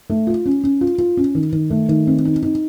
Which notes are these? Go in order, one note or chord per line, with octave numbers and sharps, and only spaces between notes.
A3
F4
C#4
C#4
F4
F4
C#4
D#3
D#3
A3
D#3
C4
D#4
D#4